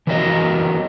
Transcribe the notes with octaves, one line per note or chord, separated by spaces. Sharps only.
E3 F#3 G4 A#4 C#5 D#5